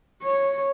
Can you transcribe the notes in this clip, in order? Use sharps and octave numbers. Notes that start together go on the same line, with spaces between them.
C#5